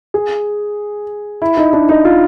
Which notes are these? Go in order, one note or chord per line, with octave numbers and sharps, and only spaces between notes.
G#4
E4
D#4
D4
D#4
F4